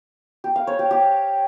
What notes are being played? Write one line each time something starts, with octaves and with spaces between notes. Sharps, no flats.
G4
F5
C#5
G4
G4